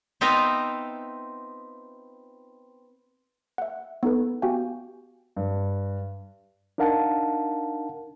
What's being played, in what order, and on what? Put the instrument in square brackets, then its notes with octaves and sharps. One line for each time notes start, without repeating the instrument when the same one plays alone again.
[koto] B3 C4 D#4 F4 D#5 E5
[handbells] E5 F#5
B3 D#4 A4 B4
B3 F#4 G4 F5 G5 G#5
[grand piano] G2
[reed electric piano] D4 D#4 A#4 F5 F#5 A5